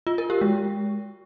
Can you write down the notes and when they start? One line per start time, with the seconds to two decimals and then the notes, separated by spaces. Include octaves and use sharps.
0.07 F4
0.18 A#4
0.30 G4
0.41 G#3